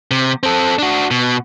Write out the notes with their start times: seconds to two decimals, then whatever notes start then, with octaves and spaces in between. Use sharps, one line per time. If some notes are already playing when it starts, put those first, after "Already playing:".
0.11 C3
0.43 C4 A4
0.79 D4 F#4
1.11 B2